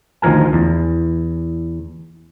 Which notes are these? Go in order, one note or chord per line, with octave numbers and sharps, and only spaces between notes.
D2 D#3 F3 A#4 G#5
E2